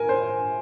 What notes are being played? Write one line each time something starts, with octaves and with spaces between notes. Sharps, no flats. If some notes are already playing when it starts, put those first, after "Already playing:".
Already playing: A#4 G#5
C5